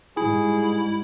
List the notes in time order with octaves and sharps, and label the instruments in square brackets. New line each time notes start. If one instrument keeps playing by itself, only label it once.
[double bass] G#2 G3 [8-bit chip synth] E4 [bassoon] G#4